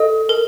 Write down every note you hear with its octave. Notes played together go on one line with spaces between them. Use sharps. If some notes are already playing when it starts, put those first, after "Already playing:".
Already playing: A4 D#5
A#4